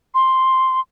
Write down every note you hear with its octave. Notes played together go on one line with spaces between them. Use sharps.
C6